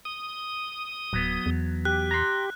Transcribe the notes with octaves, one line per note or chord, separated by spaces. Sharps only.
D#6
D1 F#3 B3
E2
G4 F#6
A#5 C6